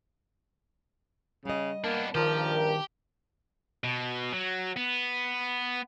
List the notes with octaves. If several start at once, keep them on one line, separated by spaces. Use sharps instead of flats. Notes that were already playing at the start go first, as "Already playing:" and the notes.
C#3 G3 D#5
A#3 B3 D4
A#1 G2 D#3 F3 G4 A#4 A5
B2
F#3
B3